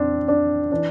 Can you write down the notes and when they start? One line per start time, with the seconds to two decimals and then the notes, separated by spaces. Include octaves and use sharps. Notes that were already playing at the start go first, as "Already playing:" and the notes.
Already playing: F2 C4 D4
0.28 D4
0.72 E3 D4